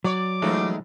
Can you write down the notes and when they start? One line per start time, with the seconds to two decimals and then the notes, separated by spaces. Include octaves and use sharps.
0.04 F#3 C#5 D5 D6
0.42 E3 G#3 A3 B3 C#4 D#4